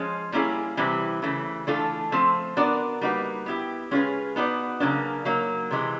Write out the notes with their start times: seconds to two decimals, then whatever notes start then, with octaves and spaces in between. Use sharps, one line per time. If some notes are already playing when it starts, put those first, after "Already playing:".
Already playing: F3 G#3 C#4
0.32 G3 A#3 C#4 E4 G#4
0.77 C3 E3 G3 C4 E4
1.22 C#3 E3 A3
1.67 E3 A3 D4 F4 A4
2.12 F3 A3 C4
2.57 B3 D4 F#4 A#4 D5
3.01 G3 A#3 D#4 F#4 B4
3.46 B3 E4 G4
3.91 G#3 C#4 F4 G#4 B4
4.36 B3 D#4 F#4 B4 D5
4.80 C#3 F#3 A#3 D4
5.25 F#3 A#3 D#4
5.71 C3 E3 G#3